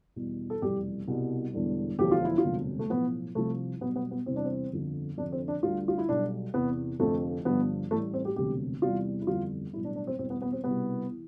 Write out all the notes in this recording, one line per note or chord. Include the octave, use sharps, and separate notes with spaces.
E2 B2 G3
A4
F1 E2 B2 G3 G4
C2 B2 G3
E1 E2 D3 G3
E1 D2 D3 F3 G4
F4
E4
F4
E1 D2 C3 G3
A3
B1 A2 F3 B3
C2 C3 F3 A3
B1 B2 G3 B3
B3
B3
E2 C3 E3 G3 C4
D4
C4
G1 F2 D3 F3
F1 F2 D3 F3 D4
C4
D4
D2 D3 G3 F4
F4
E4
B1 B2 G3 D4
E2 C3 E3 B3
F1 F2 D3 F3 A3
G1 G2 F3 B3
A1 A2 G3 A3
C4
G4
E1 D2 C3 G3 G4
E2 C3 E3 G3 F4
E4
G1 F2 E3 G3 F4
B1 A2 E3 G3 E4
D4
D4
C4
E2 B2 G3 C4
B3
B3
C4
C2 B2 G3 B3
E3